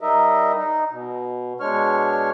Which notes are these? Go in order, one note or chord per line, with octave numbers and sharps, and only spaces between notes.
G3 D#4 A#4 D#5 E5
D#4
B2
B2 G#3 D4 C#5 C#6 F6